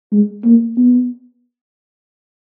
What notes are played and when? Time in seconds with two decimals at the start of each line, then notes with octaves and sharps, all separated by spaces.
0.12 G#3
0.45 A#3
0.77 B3